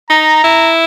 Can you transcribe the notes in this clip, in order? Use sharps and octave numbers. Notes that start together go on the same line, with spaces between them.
D#4 A#5
E4